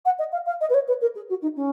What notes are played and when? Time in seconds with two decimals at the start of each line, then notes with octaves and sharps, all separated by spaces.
0.05 F#5
0.19 D#5
0.32 F5
0.46 F5
0.61 D#5
0.69 B4
0.74 C#5
0.88 B4
1.01 A#4
1.15 G#4
1.29 F#4
1.42 D#4
1.56 C#4